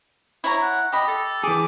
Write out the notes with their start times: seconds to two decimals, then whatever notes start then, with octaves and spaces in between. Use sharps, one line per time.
0.44 E4 C#5 A#5
0.62 F#5
0.92 G4 D#5 B5
1.08 A4
1.44 E3 G#4 D6